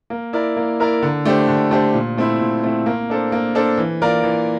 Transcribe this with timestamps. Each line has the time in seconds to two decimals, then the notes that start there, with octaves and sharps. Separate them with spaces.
0.10 A#3
0.33 E4 A#4 D5
0.57 A#3
0.80 E4 A#4 D5
1.02 D3
1.25 A3 D4 G4 C5
1.48 D3
1.71 A3 D4 G4 C5
1.94 A#2
2.17 A3 C4 E4
2.41 A#2
2.63 A3 C4 E4
2.86 A#3
3.10 D4 A4 C5
3.32 A#3
3.55 D4 A4 C5
3.78 E3
4.02 A#3 F4 A#4 D5
4.23 E3